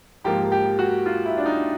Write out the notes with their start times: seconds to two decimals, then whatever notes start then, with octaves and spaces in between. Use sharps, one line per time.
0.24 G#2 F3 A#3 G4
0.52 G4
0.79 F#4
1.06 F4
1.26 E4
1.38 D4
1.46 D#4